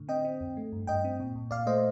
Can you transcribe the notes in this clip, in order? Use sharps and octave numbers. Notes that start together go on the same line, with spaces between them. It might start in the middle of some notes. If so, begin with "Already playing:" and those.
Already playing: A2 D3
C4 D#5 G5
C4
F2
A3
G2
G2 D#5 G5
C4
A#2
A#2
A#2 D5 F5
A3 C5 D#5